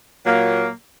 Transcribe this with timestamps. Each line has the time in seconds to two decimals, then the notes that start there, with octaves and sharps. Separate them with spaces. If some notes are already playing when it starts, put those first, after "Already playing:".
0.24 A#2 F#3 A#3